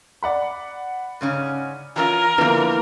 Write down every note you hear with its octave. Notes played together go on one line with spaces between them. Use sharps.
D5 F#5 B5
G#2 C#3 C#4
E3 C#4 F4 A#4
D3 E3 F3 A#3 B3